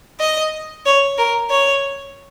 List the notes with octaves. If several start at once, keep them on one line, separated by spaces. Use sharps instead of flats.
D#5
C#5
A#4
C#5